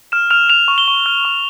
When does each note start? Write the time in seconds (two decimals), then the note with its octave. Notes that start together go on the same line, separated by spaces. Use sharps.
0.12 F6 E7
0.30 F6 F7
0.50 F6 F7
0.68 C#6
0.78 G7
0.88 C#6
1.06 F6
1.25 C#6